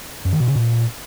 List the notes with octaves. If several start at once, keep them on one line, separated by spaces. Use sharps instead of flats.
F#2
D#3
B2
C#3
A#2